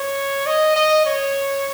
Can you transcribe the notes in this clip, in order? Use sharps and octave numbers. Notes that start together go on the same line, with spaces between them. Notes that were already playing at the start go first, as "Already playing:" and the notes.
Already playing: C#5
D#5
D#5
C#5